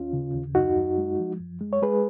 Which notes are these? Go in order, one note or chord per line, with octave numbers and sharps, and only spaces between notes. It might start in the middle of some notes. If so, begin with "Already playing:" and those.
Already playing: D#2 C#4 F4
C#3
D#2
F#2 D#4 F#4
F#2
G#3
F3
F#2
G#3
C#5
G#3 G#4 B4